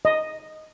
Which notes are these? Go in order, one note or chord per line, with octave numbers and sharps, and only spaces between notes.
D#5